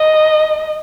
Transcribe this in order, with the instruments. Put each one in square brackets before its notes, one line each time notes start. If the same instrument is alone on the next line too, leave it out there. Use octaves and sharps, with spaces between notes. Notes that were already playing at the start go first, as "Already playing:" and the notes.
Already playing: [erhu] D#5